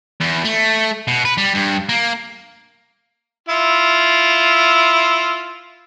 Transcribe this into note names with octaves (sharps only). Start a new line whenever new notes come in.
E2
A3
B2
B4
G3
G2
A#3
E4 F4